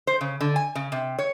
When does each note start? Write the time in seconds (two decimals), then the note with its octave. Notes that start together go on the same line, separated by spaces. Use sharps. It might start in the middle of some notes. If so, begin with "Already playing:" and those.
0.07 C5
0.21 C#3
0.41 D3
0.56 G#5
0.75 C#3
0.92 C3
1.19 C#5